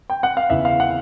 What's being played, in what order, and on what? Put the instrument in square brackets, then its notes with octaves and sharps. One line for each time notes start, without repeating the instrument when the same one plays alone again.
[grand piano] G5
F#5
F5
E2 C#3 E3 E5
F5
F#5